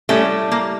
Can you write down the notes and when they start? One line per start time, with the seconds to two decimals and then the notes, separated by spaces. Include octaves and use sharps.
0.09 A2 G3 A3 C#4
0.52 A#3